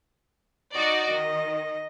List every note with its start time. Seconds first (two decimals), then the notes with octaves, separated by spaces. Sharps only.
0.75 D#4 F#4 D5 D#5
1.12 D#3